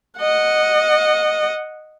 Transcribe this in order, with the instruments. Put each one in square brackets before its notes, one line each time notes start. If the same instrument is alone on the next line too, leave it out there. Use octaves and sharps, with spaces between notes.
[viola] D#5 F#5